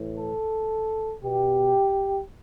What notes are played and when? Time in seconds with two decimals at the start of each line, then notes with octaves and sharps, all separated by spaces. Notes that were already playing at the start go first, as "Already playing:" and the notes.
Already playing: A2 E3
0.18 A4
1.24 B2 G4